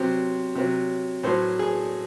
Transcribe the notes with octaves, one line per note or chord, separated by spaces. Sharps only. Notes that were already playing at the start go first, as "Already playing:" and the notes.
Already playing: C3 F#3 C5
C3 F#3
A2 F#3 C5
G#4